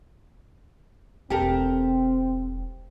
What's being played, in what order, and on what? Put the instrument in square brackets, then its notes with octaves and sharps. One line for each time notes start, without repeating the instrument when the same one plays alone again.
[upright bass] E1 [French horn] C4 [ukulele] G4 A4 A#4